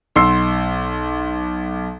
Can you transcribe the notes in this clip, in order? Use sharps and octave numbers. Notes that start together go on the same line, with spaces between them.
B1 C6 E6 C7